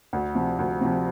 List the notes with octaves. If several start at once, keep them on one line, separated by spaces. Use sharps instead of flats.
D2
C3 F3
D2
C3 F3